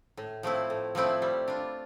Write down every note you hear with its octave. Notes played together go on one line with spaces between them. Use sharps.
A2
F3 A3 C4 E4
A2
F3 A3 C4 E4
G3
D4 F4